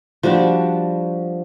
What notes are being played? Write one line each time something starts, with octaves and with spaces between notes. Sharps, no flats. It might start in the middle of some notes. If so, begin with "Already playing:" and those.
F3 G3 D4 F#4